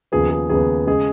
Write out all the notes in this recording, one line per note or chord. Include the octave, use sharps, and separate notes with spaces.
D#2 C#3 F3 B3 G#4
G#4
D#2 C#3 F3 B3 G#4
C#3 G#3 G#4